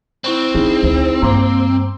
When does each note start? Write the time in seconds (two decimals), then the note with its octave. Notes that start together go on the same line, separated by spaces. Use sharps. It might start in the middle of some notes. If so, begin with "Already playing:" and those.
0.24 C4 E4 C#6 F#6
0.55 C#4 D#4 E4 G#4
0.83 D2
1.22 G2 A#3 A#5 C6 D6